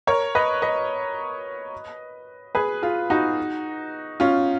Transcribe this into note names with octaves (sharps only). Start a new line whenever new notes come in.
A#4 C#5
B4 D#5
B4 D#5
G#4 B4
F4 G#4
D#4 F#4
C#4 F4